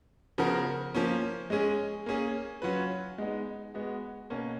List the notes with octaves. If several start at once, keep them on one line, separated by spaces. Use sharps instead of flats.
C#3 F3 B3 F#4 A#4
F3 A#3 C#4
G#3 C#4 G#4
A#3 C#4 G#4
F#3 C#4 F4 B4
G#3 B3 D#4
G#3 B3 F#4
B2 A#3 C#4